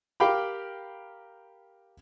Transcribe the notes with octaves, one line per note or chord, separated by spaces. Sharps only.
G4 A#4 F5 G5 B5 D6